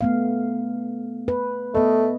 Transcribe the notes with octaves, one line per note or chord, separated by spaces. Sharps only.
A3 B3 F5
B4
A3 B3 D#5